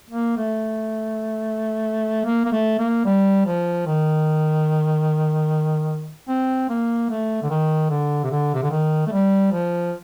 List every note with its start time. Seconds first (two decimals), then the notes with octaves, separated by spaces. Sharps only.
0.10 A#3
0.37 A3
2.25 A#3
2.45 A#3
2.52 A3
2.79 A#3
3.05 G3
3.46 F3
3.86 D#3
6.29 C4
6.70 A#3
7.10 A3
7.43 D3
7.50 D#3
7.90 D3
8.24 C3
8.31 D3
8.54 C3
8.63 D3
8.71 D#3
9.07 A3
9.12 G3
9.51 F3